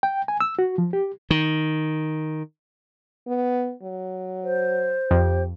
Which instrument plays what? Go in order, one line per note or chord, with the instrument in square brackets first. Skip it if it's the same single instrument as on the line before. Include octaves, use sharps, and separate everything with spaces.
[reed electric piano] G5
G#5
E6
F#4
F3
G4
[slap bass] D#3
[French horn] B3
F#3
[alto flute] C5
[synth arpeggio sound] F2 [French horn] G4